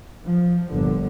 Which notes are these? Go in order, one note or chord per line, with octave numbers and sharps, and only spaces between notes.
F3
G1 A#2 D3